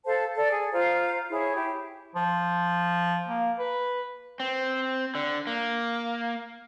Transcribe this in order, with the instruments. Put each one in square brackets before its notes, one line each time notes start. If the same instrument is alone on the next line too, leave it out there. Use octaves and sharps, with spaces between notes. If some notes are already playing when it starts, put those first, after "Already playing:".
[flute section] A4 C5 F5 A5
A4 D5
G#4
F4 C5 F5 A#5
E4 G#4 C#5
E4 G4
[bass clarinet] F3
A#3
B4
[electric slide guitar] C4
D3
A#3